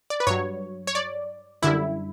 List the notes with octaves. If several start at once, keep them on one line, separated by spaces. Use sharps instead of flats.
D5
B4
G2 F#3 C#5
C#5
D5
F#2 D3 G3 E4